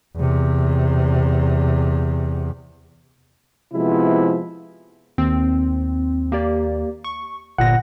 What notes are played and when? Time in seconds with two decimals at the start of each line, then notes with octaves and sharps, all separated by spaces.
0.16 E2 C3
3.74 C3 F3 G#3 B3 E4
5.18 D#2 C4
6.32 A#3 G4 D5
7.04 C#6
7.58 G1 A#2 F#5 A#6